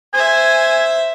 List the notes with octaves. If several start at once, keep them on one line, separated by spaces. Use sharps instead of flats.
C5 E5 G#5